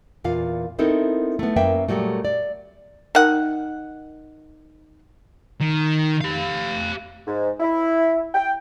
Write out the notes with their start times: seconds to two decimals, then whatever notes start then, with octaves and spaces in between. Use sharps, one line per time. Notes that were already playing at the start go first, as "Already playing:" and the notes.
0.24 E2 A#2 F4 F5
0.79 B3 C4 D#4 E4 A4 A#4
1.39 A3 B3
1.56 F#2 A#3 B4 E5 G5
1.88 A#2 D#3 F#3 G3 A3
2.25 D5
3.15 D#3 F#5
5.61 D#3
6.21 G4 F5
7.26 G#2
7.60 E4
8.34 G5